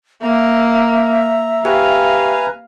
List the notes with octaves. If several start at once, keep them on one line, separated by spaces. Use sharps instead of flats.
A#3 E5 A#5
G4 B4 F5 G#5 A#5